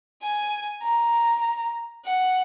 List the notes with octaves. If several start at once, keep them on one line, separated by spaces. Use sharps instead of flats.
G#5
A#5
F#5